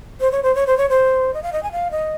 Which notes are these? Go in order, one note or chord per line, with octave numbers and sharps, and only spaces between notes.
C5
C#5
C5
C#5
C5
C#5
C5
D#5
F5
D#5
G#5
F5
D#5